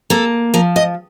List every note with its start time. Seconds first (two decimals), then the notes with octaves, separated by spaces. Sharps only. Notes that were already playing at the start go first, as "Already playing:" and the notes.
0.10 A#3 A4
0.54 F3 A#4
0.76 D#5